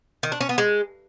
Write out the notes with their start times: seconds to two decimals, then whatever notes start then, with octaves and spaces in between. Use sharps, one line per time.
0.23 D#3
0.32 D4
0.41 C#4
0.49 B3
0.58 G#3